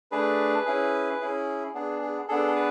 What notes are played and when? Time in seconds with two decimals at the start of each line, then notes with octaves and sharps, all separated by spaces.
0.11 A3 D4 G#4 B4
0.66 C#4 E4 G#4
1.20 C#4 E4 G#4
1.74 B3 D4 G#4
2.01 G#4
2.28 B3 D4 G#4 A4
2.55 B4